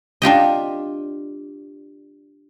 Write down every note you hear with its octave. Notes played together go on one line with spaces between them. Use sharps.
D4 F4 G4 D#5